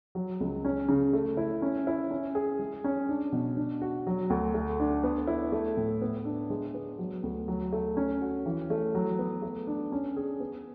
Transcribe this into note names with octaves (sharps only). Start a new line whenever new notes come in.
F#3
C#2
C#4
C#3
A3
E4
C#4
E4
C#4
G#4
G#3
C#4
D4
B2
D4
F#4
F#3
D2
A3
D4
B3
E4
A3
A2
B3
D4
G#3
B3
F#3
D2
F#3
A3
C#4
F#4
E3
A3
F#3
B3
A3
D4
C#4
G#4
B3